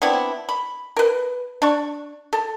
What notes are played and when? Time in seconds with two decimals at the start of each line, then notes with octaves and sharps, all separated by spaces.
0.02 B3 C4 D4 E4
0.49 B5
0.97 A#4 B4
1.62 D4 C#6
2.33 A4